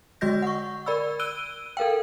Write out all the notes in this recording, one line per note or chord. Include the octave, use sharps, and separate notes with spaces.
D3 G#3 F#4 D#5 G6 A#6
F#5 C#6
A#4 D5 B5 E6
E6 F#6 D7 D#7 G7
A4 A#4 F5 G5